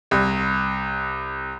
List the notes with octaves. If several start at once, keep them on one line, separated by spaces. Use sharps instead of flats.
C2